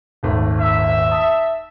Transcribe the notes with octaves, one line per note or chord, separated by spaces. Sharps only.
D#1 G#1 A3
E5
A5 D#6